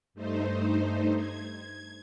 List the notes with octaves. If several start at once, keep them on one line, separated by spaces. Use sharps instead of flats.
G2 A3 D#4 C5
G#6